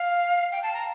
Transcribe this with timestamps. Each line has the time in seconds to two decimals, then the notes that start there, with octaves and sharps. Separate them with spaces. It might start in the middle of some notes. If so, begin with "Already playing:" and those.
Already playing: F5
0.52 G5
0.63 A5
0.74 A#5